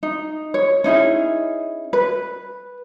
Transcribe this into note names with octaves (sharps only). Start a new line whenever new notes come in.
D#4
C#5
C#4 D#4 E4 G#4
B4